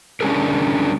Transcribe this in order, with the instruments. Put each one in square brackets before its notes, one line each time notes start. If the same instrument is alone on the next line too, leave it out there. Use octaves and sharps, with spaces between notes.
[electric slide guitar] D3 G3 C#4 D4 G#4 A#4